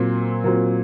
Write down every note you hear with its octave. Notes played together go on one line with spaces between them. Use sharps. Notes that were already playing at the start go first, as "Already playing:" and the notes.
Already playing: A#2 F#3 C4
A#2 F#3 C4